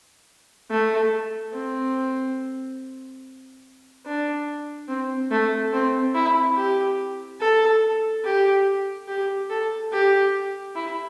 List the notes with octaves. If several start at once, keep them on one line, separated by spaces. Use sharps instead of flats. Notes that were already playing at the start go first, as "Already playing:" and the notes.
A3
C4
D4
C4
A3
C4
E4
G4
A4
G4
G4
A4
G4
E4